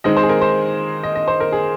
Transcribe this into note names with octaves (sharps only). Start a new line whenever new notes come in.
D#3 G#3 C4 D#4 D#5
C5
G#4
A#4
C5
D#5
D#5
C5
A#4
G#4